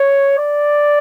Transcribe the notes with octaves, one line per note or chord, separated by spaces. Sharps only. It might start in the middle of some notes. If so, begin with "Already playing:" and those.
Already playing: C#5
D5